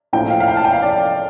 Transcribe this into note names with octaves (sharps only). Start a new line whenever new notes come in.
A#1 A2 F3 G5
F5
F5
G5
A5
G5
F5
D5